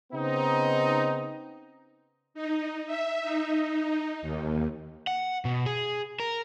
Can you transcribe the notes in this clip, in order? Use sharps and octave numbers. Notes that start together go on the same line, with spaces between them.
C#3 B3 C4 D#4
D#4
E5
D#4
D#2
F#5
B2
G#4
A#4